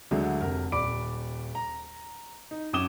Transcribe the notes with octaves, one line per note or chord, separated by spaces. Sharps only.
D2 D3 F#3 G#3
F1 A#4
D#1 D5 B5 D6 D7
A#5
D#4
F#2 C#4 D6 D#6 E7 G7